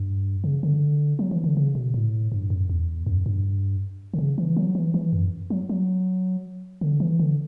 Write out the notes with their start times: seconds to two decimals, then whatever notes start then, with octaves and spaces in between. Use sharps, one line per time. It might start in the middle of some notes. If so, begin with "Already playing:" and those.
Already playing: G2
0.44 C#3
0.63 D3
1.19 F#3
1.31 E3
1.44 D3
1.57 C#3
1.75 B2
1.94 A2
2.32 G2
2.50 F#2
2.70 E2
3.06 F#2
3.26 G2
4.14 D3
4.18 C#3
4.38 E3
4.57 F#3
4.75 E3
4.94 E3
5.13 F#2
5.50 F#3
5.69 F#3
6.81 D3
7.00 E3
7.19 D3